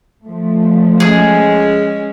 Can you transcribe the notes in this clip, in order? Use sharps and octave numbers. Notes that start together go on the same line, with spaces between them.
F3 A3
G#3 C#4 G#4